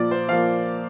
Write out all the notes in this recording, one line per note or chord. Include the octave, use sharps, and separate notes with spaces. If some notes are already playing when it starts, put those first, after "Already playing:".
Already playing: A#2 F3 A#3 D5
C5
F3 A#3 F5